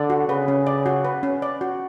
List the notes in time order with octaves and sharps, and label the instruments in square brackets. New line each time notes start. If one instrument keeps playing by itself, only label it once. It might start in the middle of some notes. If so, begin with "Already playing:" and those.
Already playing: [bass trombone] D3 [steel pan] D5
[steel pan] F#4
[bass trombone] C#3 [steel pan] B4
[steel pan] C#4
D5
F#4
B4
C#4
D5
F#4